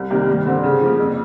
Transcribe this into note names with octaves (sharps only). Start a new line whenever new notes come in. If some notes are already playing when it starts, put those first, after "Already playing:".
Already playing: C2
C3 D#3 G3 A#3
G2
D3 G3 C4
C#3
F3 A#3
F2